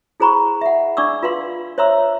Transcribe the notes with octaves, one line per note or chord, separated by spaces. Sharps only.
E4 G#4 C5 A#5 B5 C#6
E5 F#5
D4 D5 C#6 D6 E6
F4 B4 F5 C6
C5 C#5 E5 A#5 C6 E6